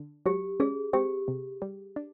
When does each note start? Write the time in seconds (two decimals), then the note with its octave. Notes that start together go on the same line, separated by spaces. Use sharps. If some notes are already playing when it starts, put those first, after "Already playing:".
Already playing: D3
0.26 F#3 G4
0.60 C#4 G#4
0.93 C4 G4
1.28 C3
1.62 G3
1.96 D4